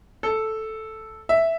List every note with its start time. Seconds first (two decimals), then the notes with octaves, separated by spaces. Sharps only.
0.23 A4
1.29 E5